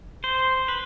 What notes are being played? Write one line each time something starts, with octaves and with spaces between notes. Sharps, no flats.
C5
B4